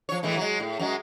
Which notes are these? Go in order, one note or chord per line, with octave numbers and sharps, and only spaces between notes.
F3 C#5
A2 E3 G#3
F#3 G#3
A2
F#2 F#3 G#3